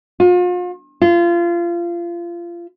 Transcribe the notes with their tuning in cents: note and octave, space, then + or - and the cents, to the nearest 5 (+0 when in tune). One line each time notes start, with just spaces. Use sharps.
F4 +40
F4 -25